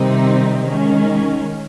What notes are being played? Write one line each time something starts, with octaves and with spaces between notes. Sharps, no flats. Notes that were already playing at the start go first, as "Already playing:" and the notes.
Already playing: C3 D#3 G3 C4 D#4
D#3 G#3 C#4